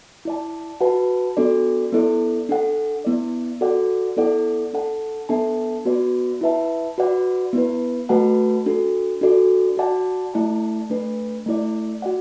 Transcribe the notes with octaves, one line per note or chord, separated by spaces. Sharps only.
E4 D5 A5
F#4 B4 F#5 A5
B3 D4 F#4 A4 D5
B3 E4 A4 D5
D4 A4 F#5
B3 E4 D5
F#4 A4 D5 F#5
B3 E4 A4 D5 F#5
D4 A4 F#5 A5
B3 D4 A4 E5 A5
B3 F#4 B4 D5
E4 B4 E5 A5
F#4 B4 D5 F#5
B3 E4 B4
A3 F#4 B4 F#5 A5
D4 F#4 A4
D4 F#4 A4 D5
F#4 D5 F#5 A5
A3 E4 D5 A5
A3 D4 B4
A3 E4 D5
F#4 D5 F#5